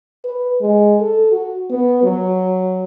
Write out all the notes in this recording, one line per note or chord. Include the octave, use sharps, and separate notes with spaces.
B4
G#3
A4
F#4
B3
F#3